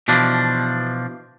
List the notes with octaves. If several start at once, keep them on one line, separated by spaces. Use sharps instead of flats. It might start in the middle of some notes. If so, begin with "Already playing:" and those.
B2 E3 F3 D4